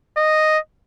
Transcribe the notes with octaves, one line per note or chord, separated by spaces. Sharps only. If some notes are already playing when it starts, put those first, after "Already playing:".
D#5